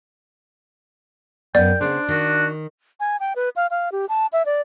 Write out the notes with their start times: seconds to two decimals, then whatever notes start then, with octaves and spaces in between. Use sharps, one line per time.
1.55 F#2 B3 D5 G5
1.81 C#3 B3 D4 C5
2.08 D#3 F#4
3.00 G#5
3.20 G5
3.36 B4
3.56 F5
3.71 F5
3.92 G4
4.09 A5
4.33 E5
4.46 D5